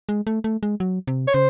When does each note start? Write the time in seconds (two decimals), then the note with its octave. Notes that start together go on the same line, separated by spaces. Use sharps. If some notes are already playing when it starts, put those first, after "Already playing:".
0.09 G#3
0.27 A3
0.44 A3
0.63 G#3
0.80 F#3
1.07 C3
1.27 C#5
1.34 C#3 C5